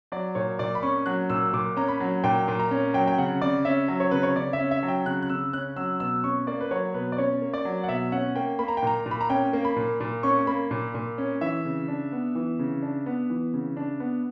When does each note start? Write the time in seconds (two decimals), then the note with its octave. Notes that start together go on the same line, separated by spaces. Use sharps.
0.12 F#3 D5
0.35 A#2 C#5
0.59 A#2 D5
0.75 B5
0.83 C#4 C#6
1.06 F#3 F#6
1.30 A#2 E6
1.53 A#2 D6
1.76 C#4 A#5
1.88 B5
2.00 F#3
2.24 A#2 G5
2.48 A#2
2.59 A#5
2.71 C#4
2.94 F#3 G5
3.08 G5
3.18 C#3 F#5
3.42 C#3 D5
3.65 C#4 E5
3.88 F#3
4.00 C#5
4.11 C#3 B4
4.23 C#5
4.36 C#3 D5
4.53 E5
4.59 C#4
4.71 E5
4.83 F#3
4.88 G5
5.06 C#3 F#6
5.22 F#6
5.29 C#3 E6
5.53 C#4 F#6
5.76 F#3 E6
6.00 B2 E6
6.24 C#4 C#6
6.47 A#3 D5
6.61 B4
6.71 F#3 C#5
6.94 B2 B4
7.12 D5
7.18 C#4 C#5
7.42 A#3
7.54 D5
7.65 F#3
7.84 F#5
7.88 B2 E5
8.12 C#4 F#5
8.36 A#3 G5
8.59 A#3 B5
8.68 A#5
8.77 G5
8.83 A#2 A#5
9.06 A#2
9.11 B5
9.21 A#5
9.30 C#4 G5
9.53 A#3
9.65 B5
9.76 A#2
10.00 A#2
10.23 C#4 C#6
10.47 A#3 B5
10.71 A#2
10.95 A#2
11.18 C#4
11.41 E3 E5
11.65 C#3
11.88 D4
12.12 B3
12.35 E3
12.59 C#3
12.82 D4
13.06 B3
13.30 E3
13.54 C#3
13.77 D4
14.00 B3